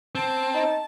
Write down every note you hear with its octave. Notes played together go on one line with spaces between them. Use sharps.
C4 A5
D#4